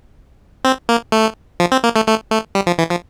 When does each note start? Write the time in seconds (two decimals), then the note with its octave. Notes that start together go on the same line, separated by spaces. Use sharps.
0.65 C4
0.89 A#3
1.12 A3
1.60 F3
1.72 C4
1.84 A#3
1.96 A3
2.07 A3
2.31 A3
2.55 G3
2.67 F3
2.78 E3
2.90 F3